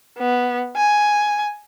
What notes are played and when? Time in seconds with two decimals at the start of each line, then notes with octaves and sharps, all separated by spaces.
0.19 B3
0.76 G#5